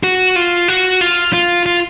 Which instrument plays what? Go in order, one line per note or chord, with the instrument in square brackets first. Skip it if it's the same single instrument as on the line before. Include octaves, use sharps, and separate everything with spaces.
[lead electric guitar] F#4
F4
F#4
F4
F4
F4